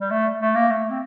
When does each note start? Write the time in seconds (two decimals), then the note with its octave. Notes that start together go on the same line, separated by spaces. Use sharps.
0.01 G3
0.10 A3
0.40 A3
0.55 A#3
0.71 A3
0.90 C4